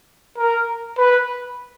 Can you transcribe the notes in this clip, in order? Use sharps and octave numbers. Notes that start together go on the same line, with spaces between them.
A#4
B4